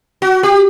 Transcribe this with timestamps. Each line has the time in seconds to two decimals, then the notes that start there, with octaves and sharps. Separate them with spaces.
0.22 F#4
0.43 G4